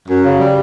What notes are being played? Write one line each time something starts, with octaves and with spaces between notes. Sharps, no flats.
F#2
C#3
G3